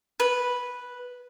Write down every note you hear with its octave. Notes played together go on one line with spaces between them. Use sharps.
B4